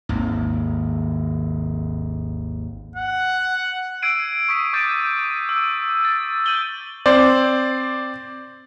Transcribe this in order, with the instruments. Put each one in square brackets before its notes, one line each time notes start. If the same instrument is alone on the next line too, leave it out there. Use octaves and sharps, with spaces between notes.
[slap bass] G#1 D#2
[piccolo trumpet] F#5
[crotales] E6 G#6 C7 D7 D#7
C#6 D#6 B6 D7
D6 G6 A6 D7 D#7
E6
A6
G6 D#7 F#7 G7
[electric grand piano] C4 C5 D5